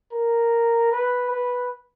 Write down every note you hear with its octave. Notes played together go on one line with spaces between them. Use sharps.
A#4
B4
B4